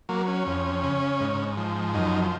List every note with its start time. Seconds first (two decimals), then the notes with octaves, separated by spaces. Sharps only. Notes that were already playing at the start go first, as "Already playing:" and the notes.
0.09 F#3 A#3
0.28 C#4
0.47 F2
0.83 C#3
1.20 G#2
1.57 F3
1.94 F#2 D#4